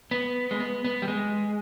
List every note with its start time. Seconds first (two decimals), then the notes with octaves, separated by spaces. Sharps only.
0.11 B3
0.51 G#3
0.60 B3
0.84 B3
1.02 G3
1.08 G#3